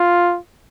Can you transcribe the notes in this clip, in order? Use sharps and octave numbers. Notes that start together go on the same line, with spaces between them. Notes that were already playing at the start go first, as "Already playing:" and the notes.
Already playing: F4